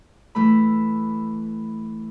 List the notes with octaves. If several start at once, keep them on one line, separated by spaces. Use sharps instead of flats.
E3 A3 B5